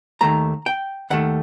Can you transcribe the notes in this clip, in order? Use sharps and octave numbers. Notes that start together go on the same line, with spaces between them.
D#2 D#3 A3 A#5
G5
D#2 D#3 A3 F#5